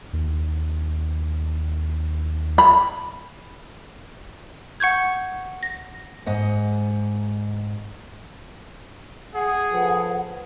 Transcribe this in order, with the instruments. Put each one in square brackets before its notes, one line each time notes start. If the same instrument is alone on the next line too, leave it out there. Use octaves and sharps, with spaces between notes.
[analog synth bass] D#2
[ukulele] B5
[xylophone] F#5 C#6 G6 G#6
A#6
[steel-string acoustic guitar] G#2 D#5 F#5
[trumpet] G#4 [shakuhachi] F#5
[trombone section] F3 A4 B4